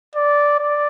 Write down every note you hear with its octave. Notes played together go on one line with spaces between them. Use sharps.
D5
D5